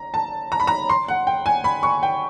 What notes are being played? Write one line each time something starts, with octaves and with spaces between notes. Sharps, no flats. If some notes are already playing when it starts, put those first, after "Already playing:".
Already playing: A#5
A5
A#5
B5
A#5
C6
F#5
G5
G#5
B5
C#6
G5